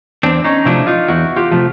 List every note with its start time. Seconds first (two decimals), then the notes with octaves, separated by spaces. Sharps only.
0.23 E2 C4 D4
0.44 C#4 D#4
0.66 C3 F3 A3 D4 E4
0.87 D#4 F4
1.08 E2 E4 F#4
1.36 F4 G4
1.51 C3 F3 A3